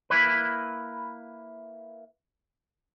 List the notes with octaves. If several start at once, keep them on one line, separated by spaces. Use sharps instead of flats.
A#3 E4 B4